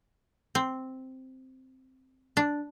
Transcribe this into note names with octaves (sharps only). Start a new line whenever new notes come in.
C4
D4